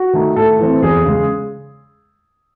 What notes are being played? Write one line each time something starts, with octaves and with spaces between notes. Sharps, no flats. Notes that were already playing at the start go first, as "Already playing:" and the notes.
Already playing: F#4
D#3 A3 D#4
A2 A4
E3 A3 C4
E2 G#4
C#3 G#3